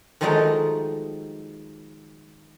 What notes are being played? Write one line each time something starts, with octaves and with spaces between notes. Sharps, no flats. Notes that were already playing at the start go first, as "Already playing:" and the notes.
D#3 F3 F#3 G#3 A3 D#4